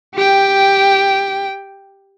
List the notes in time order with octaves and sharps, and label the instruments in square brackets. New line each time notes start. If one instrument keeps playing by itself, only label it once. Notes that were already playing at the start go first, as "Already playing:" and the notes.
[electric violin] G4 G5